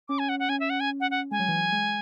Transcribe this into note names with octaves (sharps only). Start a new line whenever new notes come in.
C#4 D6
G#5
F#5
F#5
C#4 G#5
E5
F#5
G#5
F#5
F#5
G#3 G#5
F#3
E3
F#3
G#3